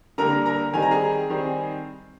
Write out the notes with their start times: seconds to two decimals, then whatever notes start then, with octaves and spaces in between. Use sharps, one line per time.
0.18 D3 G3 A#3 A#4 A#5
0.46 A#4 A#5
0.74 D#3 G3 C4 D#4 G#5
0.82 A#5
0.91 G#4 G#5
1.30 D#3 G3 C4 D#4